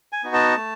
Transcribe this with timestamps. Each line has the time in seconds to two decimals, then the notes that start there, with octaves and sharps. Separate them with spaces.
0.13 G#5
0.24 B3 D#4 F#4
0.33 A5
0.56 A3